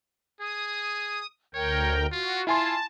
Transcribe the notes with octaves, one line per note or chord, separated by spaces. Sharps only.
G#4 D#6
D2 A#4 C#5 G5
F4 F#4
E4 F4 G#5 A5 C6